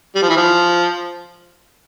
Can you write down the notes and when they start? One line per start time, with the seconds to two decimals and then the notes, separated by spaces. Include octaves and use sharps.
0.15 G3
0.23 F3
0.29 E3
0.37 F3